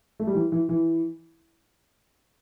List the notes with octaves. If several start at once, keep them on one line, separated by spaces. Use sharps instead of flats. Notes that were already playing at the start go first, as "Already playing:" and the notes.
A3
G3
E3
E3
E3